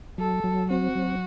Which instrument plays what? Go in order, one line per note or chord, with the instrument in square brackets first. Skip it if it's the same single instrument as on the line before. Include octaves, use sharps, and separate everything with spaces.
[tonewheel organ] F#3 [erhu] A4
[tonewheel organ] F#3
[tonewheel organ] C4 [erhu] F#4
[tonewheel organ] F#3